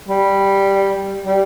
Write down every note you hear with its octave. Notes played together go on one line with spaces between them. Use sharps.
G3
G3